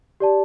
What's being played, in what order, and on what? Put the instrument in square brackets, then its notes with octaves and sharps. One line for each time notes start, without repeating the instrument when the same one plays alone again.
[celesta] G4 D5 A5